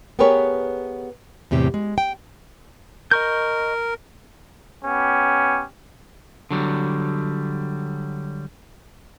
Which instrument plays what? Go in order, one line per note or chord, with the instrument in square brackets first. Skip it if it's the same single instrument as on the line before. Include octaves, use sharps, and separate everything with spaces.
[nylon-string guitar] B3 G4 G#4 A#4 B4 C#5
E2 A2 C3 G4
G#3
G5
[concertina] A#4 [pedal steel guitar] D#5 C#6 G6
[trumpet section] B3 C#4 G4
[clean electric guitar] D3 F#3 G3